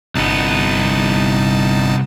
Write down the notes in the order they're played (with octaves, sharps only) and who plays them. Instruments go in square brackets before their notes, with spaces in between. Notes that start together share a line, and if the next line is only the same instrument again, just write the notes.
[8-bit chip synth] G1 D#4 A5 [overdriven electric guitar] C2 B3